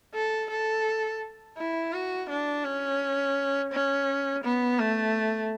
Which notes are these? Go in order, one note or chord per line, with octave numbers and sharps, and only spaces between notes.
A4
A4
E4
F#4
D4
C#4
C#4
B3
A3